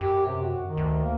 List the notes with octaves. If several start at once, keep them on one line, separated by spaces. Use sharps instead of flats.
F#2 G4
C3
F#4
D#3
D2
A#3